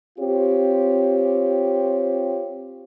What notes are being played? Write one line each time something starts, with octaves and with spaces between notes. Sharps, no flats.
C4 F4 G4 C#5